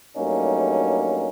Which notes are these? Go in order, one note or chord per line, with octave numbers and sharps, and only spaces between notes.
G2 F#3 A3 A#3 C#4 D#4